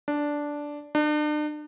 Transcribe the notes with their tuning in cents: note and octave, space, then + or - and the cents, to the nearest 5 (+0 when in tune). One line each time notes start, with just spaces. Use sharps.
D4 -5
D4 +40